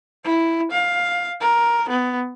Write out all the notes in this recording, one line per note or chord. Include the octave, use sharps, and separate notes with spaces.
E4
F5
A#4
B3